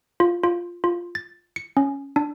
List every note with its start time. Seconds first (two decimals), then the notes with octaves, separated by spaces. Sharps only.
0.20 F4
0.43 F4
0.84 F4
1.15 A6
1.56 C#7
1.77 C#4
2.16 D4